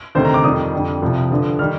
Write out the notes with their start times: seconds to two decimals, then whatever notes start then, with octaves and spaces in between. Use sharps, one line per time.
0.15 D2 C3 D#3 C5
0.25 A#5
0.34 D6
0.44 F2 D#3 G3 D#6
0.73 F2 D3 G3
1.02 C2 C3 F3
1.31 G2 D3 F3
1.59 D#3 G3 F6